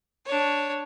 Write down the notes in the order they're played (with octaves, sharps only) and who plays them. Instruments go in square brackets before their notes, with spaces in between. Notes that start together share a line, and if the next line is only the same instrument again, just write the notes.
[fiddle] D4 C#5